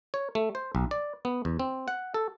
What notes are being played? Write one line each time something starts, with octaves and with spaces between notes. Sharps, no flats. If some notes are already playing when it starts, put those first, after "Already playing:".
C#5
A3
C5
B1
D5
B3
E2
C4
F#5
A4